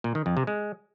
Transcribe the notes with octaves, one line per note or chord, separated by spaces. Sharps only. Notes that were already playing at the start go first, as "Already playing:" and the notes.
A#2
D#3
F2
C3
G#3